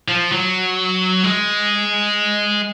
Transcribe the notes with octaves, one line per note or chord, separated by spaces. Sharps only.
F3
F#3
G#3